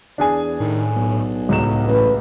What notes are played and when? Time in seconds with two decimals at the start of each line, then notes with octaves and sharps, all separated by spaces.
0.18 E2 D4 G#4 G#5
0.60 A2 D#3
0.96 B1
1.49 C#2 A2 F#3 E7
1.88 A1 B4